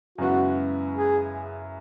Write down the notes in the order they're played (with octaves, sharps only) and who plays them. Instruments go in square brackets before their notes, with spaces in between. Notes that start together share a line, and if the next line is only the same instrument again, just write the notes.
[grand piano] F#2 C#3 G#3 B3 E4 [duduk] F#4
[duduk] G#4